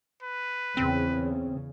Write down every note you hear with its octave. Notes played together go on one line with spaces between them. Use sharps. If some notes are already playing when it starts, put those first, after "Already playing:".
B4
E2 C#3 C4